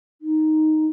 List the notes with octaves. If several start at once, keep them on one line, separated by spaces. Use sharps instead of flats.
D#4